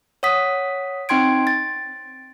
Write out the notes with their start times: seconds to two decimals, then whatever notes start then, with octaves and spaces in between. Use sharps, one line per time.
0.23 C#5 F#5 D#6 B6
1.09 C4 D#4 G5 C6 G#6 D7
1.47 A6